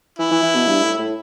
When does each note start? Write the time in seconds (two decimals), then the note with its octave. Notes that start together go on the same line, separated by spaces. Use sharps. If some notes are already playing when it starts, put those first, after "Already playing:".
0.19 E3 E4
0.31 E3
0.43 E3
0.55 B2
0.67 G2
0.83 A2
0.99 A2